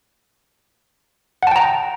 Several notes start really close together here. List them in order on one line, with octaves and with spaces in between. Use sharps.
F#5 A5 G5 A#5